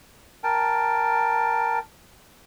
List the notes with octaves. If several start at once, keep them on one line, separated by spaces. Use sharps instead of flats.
A#4 G5 A5